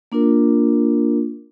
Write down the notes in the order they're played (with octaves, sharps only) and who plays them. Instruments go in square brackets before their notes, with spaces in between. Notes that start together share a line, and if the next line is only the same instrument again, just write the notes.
[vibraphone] A#3 D4 F4 A#4